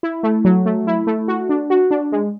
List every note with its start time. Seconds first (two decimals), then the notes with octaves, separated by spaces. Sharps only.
0.03 E4
0.23 A3
0.45 F#3
0.66 A3
0.87 E4
1.07 A3
1.28 F#4
1.49 D4
1.70 F#4
1.91 D4
2.12 G#3